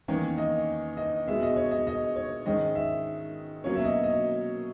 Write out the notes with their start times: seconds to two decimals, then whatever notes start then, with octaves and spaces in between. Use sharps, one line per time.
0.08 E2 D#3 A#3 C#4 C#5
0.38 D#5
0.97 D#5
1.27 B2 G#3 B3 E5
1.43 D#5
1.56 C#5
1.71 D#5
1.87 D#5
2.16 C#5
2.45 G#2 D#3 G#3 C#4 D#5
2.75 E5
3.64 B2 F#3 A#3 C#4 C#5
3.75 E5
3.84 D#5
4.04 D#5